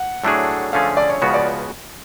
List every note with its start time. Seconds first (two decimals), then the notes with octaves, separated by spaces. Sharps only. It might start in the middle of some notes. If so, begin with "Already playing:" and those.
Already playing: F#5
0.24 A2 F#3 A3 D4 G#4
0.73 D3 F3 A3 C#4 G#4 F5
0.97 D5
1.10 C#5
1.22 C#2 C#3 F3 B3 F#4 C#5
1.34 D5